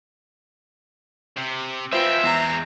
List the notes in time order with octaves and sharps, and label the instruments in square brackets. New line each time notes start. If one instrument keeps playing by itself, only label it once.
[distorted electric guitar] C3
[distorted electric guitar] G#3 C4 [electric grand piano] F4 C5 [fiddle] B4 G5 [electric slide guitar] E5
[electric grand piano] E2 [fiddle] A#5